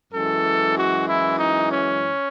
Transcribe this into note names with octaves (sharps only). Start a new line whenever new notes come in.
F#2 E3 G#3 A4
F#4
E4
D#4
C#4